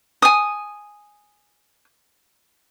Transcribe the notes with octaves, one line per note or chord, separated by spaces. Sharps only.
G#5 D#6